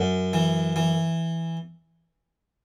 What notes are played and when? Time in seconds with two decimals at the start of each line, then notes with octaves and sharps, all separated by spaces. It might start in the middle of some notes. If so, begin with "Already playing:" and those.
Already playing: F#2
0.33 E3
0.76 E3